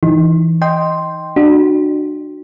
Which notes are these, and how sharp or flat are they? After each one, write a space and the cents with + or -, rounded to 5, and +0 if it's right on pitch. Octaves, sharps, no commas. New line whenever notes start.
E3 +0 D#4 +0
D#5 +0 G5 +0 C6 +0
D4 +35 F#4 +0